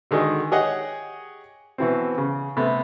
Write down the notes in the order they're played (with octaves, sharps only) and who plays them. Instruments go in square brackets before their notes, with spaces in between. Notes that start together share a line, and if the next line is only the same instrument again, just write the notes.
[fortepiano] D3 D#3 G#3 F#4 D#5
G4 G#4 C#5 D#5 F#5
B2 E3 C4
C#3
C3 A3 B3